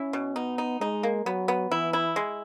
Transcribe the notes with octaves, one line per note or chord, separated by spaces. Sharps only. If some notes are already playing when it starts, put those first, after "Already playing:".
Already playing: C#4 E4
B2
B3 D#4
D#4
G#3 D#4
A#3
F#3 B3
B3
E3 E4
E4
G#3